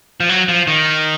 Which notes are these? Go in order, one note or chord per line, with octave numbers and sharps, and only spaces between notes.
F3
F#3
F3
D#3